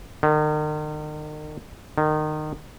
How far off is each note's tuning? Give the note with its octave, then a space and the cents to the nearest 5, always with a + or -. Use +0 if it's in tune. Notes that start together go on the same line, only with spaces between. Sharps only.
D#3 -40
D#3 -25